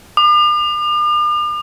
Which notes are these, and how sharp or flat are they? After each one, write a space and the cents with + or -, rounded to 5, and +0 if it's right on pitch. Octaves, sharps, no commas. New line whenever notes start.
D6 +45